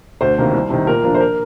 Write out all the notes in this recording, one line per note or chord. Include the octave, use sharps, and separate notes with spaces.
D2 C5
C3 D#3 A#3
C2
C3 D#3
A#2 A#4
F3 A#3 D4
C5
A#4